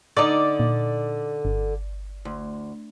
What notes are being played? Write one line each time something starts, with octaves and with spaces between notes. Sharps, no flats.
D3 D#4 D5
A#2
G1
D2